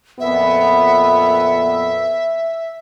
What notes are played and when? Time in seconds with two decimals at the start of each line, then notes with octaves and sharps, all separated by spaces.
0.20 F2 A#2 B3 E5